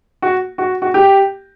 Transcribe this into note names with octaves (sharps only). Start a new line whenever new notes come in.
F#4
F#4
F#4
G4